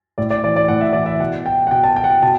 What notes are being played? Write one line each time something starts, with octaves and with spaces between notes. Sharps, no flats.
A2 D5
D5
E3 D5
D5
A2 F#5
E5
E3 D5
E5
B2 F#5
G5
F#5
B2 G5
A5
G5
F#5
G5
B2 A5